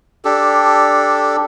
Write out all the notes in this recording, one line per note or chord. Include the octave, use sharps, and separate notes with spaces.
D4 G4 A4